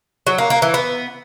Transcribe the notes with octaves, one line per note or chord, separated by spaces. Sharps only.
F#3
A#3
A#3
E3
B3